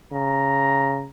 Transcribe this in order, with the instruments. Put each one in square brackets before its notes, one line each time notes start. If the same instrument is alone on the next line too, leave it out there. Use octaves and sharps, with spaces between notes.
[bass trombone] C#3 [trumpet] A#5